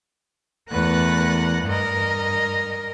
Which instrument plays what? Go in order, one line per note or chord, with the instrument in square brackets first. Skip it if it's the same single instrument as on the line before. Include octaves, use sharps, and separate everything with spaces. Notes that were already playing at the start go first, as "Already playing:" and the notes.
[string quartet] E2 A3 A#4 B4 F#5 F#6
G2 A#4 D#5